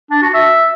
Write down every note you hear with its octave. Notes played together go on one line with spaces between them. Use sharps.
D4
F#4
E5